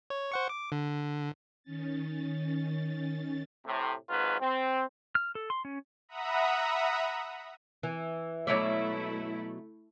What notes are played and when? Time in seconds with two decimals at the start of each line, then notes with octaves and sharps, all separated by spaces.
0.10 C#5
0.32 C5 F#5 C#6
0.49 D6
0.72 D3
1.63 D#3 C#4 A6
3.66 A2 C3
4.09 G#1 G#2 F#3 F4 B4
4.40 C4
5.15 F6
5.35 A4
5.50 C6
5.65 C#4
6.09 E5 F#5 A#5 B5 D#6
7.83 E3
8.47 B2 F#3 A3 E4 C#5 D5 E5